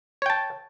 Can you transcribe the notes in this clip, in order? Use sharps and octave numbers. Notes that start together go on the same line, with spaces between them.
C#5 G5 A5